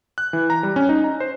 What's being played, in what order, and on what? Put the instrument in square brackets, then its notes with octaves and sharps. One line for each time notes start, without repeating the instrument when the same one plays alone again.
[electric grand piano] F#6
E3
A#5
G3
C#4
D#4
A#5
C5